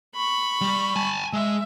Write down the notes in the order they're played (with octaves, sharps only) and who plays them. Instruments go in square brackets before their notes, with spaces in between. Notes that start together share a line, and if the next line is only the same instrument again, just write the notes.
[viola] B5 C#6
[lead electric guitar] G3
G#5 A5
[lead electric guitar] G#3 [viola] E5